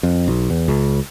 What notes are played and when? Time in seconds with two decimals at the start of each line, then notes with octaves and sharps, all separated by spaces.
0.03 F2
0.28 B1
0.50 E2
0.68 C#2